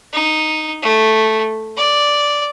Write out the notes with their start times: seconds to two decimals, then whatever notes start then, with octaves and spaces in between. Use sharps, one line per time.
0.13 D#4
0.83 A3
1.77 D5